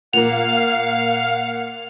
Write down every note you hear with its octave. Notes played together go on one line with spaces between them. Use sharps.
A#2 A#3 F5 F#5 F7